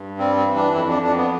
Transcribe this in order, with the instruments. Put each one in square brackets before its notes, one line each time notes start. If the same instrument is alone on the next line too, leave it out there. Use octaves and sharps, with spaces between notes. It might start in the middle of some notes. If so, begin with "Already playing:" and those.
Already playing: [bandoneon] G2
G3 C4
C4
E3
D4
F2 E4
D4
F2 D4
B3